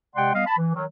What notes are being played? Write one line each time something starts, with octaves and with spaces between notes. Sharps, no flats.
C3 G#3 D5 F#5 G5 C6
G3 B3 D#5 F5
A5 B5
E3
D#3 F#3